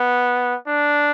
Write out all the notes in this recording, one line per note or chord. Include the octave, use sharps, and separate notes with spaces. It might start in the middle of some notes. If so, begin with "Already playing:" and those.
Already playing: B3
D4